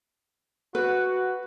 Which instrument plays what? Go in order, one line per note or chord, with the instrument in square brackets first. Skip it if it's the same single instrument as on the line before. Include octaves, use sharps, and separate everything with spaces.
[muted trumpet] F#4 [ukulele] B4